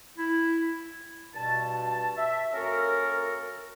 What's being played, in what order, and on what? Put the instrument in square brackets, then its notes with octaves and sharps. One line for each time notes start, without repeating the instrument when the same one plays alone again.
[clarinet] E4
[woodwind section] G2 B2 A5
E5
A#3 C#4 F#4 A4 A#4